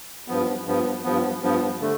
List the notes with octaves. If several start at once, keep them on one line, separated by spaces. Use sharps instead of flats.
G2 F3 B3
G2 F3 B3
G2 F3 B3
G2 F3 B3
D3 A3